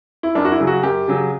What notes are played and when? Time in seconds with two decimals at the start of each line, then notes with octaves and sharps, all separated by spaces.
0.23 E4
0.35 F#2 D4
0.45 F#4
0.52 E4
0.60 C#3 F#3
0.67 F#4
0.83 F#2 G4
1.08 C#3 F#3